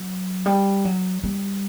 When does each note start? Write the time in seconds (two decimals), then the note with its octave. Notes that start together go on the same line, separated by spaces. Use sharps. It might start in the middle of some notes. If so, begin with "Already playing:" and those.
Already playing: F#3
0.46 G3
0.85 F#3
1.24 G3